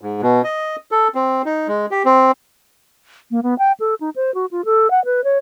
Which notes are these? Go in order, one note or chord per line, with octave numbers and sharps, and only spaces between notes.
G#2
B2
D#5
A4
C4
D#4
G#3
G4
C4
A#3
B3
G5
A4
D#4
C5
F#4
F4
A4
F#5
B4
C#5